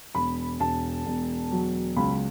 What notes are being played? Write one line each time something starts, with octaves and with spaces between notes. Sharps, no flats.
E1 B5
E1 A5
E1
F#3
C#2 B5